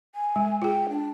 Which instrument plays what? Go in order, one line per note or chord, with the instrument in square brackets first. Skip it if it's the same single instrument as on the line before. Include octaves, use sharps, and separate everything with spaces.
[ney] G#5
[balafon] G#3
[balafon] F4 G#4 [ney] G5
[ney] D4